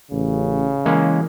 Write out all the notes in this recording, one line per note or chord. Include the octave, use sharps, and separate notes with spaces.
A1 C#3
E3 G#3 A#3 C#4